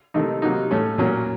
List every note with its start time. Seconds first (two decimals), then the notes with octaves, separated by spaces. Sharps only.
0.14 C3 D#3 A3 D#4
0.42 C3 F#3 A#3 D#4
0.71 A2 A3 C#4
0.98 A#2 F#3 A#3 C#4